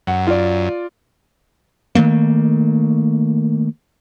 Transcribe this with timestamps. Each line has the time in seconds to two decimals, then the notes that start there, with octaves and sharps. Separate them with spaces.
0.07 F#2 F#5
0.27 F4 D5
1.95 D#3 F3 A3 A#3